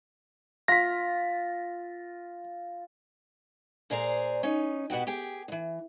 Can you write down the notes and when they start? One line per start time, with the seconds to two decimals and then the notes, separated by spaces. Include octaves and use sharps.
0.68 F4 A#6 B6
3.90 A#2 G#4 C5 D5 A#5
4.43 C#4 D#4
4.90 B2 B3 F#4 G4
5.07 G4 G#4 G5
5.48 D#2 E3